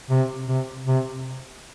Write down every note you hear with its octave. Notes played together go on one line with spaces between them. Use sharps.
C3
C3
C3